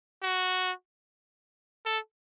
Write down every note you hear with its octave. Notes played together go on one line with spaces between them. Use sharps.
F#4
A4